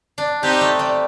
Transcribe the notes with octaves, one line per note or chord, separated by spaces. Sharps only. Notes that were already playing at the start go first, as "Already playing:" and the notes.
D4
C4 D#4 G4
A3
G3